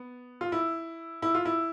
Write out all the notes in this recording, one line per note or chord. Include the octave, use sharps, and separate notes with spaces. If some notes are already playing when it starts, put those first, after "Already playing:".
Already playing: B3
F4
E4
E4
F4
E4